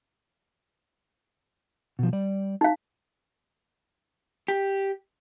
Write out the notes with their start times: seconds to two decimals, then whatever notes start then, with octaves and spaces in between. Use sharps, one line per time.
1.99 B2 F3
2.13 G3 D5
2.61 D#4 F5
4.48 G4